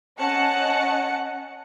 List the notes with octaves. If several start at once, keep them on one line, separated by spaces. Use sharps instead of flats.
C#4 D#5 F#5 A5 F#6 C#7